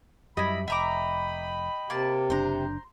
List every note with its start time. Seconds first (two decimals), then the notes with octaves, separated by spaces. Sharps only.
0.37 F#2 G3 E4 D#5 B5
0.68 F1 D#5 E5 G5 A#5 B5 D6
1.90 C3 A#3 A5
2.30 F#1 C4 D4 C5 A#5